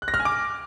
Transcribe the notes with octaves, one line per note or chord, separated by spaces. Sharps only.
F#6
A#6
F6
G#5
D6